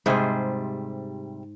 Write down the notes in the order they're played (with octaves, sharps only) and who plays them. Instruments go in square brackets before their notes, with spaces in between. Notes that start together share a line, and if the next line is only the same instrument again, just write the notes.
[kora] G#2 G#4 C5 [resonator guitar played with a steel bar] C3 G3